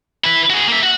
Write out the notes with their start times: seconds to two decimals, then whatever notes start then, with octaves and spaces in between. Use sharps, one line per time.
0.24 E4 B4
0.50 F#4 G#4
0.68 A#3 E5
0.83 F#4 F#5